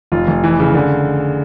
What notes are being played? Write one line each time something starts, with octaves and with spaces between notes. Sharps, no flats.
F1 F4
F1
E3
C#3
D3